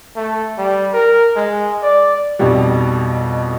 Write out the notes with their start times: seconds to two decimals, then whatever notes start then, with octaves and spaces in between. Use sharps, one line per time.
0.17 A3
0.58 G3
0.93 A#4
1.36 G#3
1.82 D5
2.39 B1 F2 B2 G3